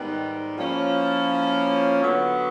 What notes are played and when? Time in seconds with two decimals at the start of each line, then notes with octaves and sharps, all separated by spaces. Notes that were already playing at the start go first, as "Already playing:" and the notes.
Already playing: G#2 D#3 G3 B3
0.57 F3 A#3 C#4 E4
2.01 D3 F#3 B3